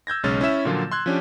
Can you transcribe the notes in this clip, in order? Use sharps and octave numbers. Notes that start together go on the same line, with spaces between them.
E6 G6 G#6 A#6
B1 C#3 G#3 C#4 F6 A6
C#4 E4 E5 E7
A#2 D3 F3 F#3 A#3 F4
C6 E6 F#6 G#6
F3 C#4 D4 G4